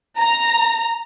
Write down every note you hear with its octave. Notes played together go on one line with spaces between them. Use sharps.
A#5